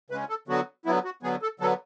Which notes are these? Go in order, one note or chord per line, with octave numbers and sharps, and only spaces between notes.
C#3 G#3 C#4 B4
A4
D3 F#3 B3 F#4
D3 F#3 B3 E4
F#4
D3 F#3 B3 G#4
A4
D3 F#3 B3 A4